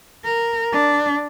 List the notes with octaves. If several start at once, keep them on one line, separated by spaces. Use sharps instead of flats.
A#4
D4